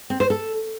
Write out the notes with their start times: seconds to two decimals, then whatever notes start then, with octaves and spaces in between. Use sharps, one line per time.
0.10 C4
0.20 C5
0.30 A4